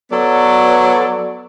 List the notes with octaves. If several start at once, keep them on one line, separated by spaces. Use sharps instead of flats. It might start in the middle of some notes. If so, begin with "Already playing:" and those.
F#3 B3 A4 C#5 D5